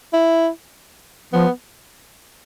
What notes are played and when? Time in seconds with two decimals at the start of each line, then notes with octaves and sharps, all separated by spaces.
0.13 E4
1.33 F3 B3